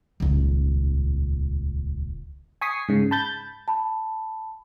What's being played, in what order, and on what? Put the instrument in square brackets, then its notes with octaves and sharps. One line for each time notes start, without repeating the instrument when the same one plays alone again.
[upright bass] D#1 C#2
[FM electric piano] G#5 C#6 D#6 B6 C7
G#2 C#3
A5 B5 G6 A6
[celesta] A5 B5